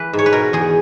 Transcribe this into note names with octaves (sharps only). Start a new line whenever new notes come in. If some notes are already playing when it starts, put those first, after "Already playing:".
Already playing: E3 B4
G#2
C#5
B4
B2 A#4
E2 G#4